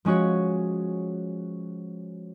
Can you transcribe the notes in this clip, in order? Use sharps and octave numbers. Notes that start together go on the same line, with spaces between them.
F3 G#3 C#4 F#4 C#5